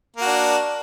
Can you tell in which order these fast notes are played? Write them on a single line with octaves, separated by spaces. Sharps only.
A#3 F#4 D4